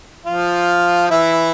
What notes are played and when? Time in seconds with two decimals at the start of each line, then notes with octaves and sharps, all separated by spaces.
0.26 F3 F4
1.10 E3 E4